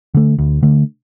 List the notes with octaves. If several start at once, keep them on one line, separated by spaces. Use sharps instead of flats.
D3 A3
D2
D3 A3